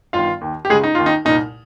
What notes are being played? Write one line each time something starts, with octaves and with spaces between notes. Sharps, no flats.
G1 G2 D#3 F4 F5
D#2 D#3
G4
C#2 C#3 G#3 G#4
D#4
D#2 D#3 F4
D#4
C2 A#2 D#4